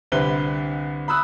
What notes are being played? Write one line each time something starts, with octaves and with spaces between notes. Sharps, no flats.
C2 D3 C4 B4 G7
B5 D#6 E6 F#6